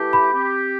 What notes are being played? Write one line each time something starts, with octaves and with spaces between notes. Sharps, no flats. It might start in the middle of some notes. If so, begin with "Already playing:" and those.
Already playing: E3 A3 E4 G4
B5
C4 G4